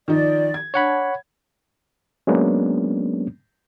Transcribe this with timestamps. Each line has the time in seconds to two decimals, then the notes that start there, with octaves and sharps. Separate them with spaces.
0.08 D#3 F3 D#4 D5
0.54 G#6
0.74 D4 C#5 F#5 B5
2.27 F#3 G#3 A#3 B3 C#4 D4